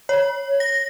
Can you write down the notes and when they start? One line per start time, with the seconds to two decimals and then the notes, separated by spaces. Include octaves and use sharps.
0.09 C#5
0.60 A#6